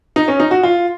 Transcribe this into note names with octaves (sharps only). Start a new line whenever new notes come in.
D#4
C#4
D#4
F#4
F4